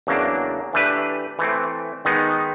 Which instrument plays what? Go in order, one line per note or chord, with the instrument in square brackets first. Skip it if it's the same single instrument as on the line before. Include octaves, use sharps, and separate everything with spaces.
[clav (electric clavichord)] E2 C#3 F#3 A#3 D4
E3 A3 D4 G4 B4
E3 A3 C4
D#3 G#3 B3 D#4